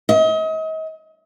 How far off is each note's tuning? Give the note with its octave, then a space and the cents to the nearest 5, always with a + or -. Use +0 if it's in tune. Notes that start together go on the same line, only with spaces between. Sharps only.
D#5 +35